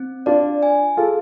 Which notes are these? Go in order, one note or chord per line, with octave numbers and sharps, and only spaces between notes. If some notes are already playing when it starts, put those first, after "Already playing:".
Already playing: C4
D4 F4 D5
G#5
F4 G#4 A4